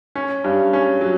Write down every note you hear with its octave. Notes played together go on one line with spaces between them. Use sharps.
C#4
G2
C#4
F#3